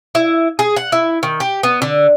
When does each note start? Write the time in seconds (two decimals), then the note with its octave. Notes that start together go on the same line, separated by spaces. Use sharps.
0.15 E4
0.59 G#4
0.76 F#5
0.92 E4
1.23 D#3
1.40 G4
1.63 B3
1.82 D3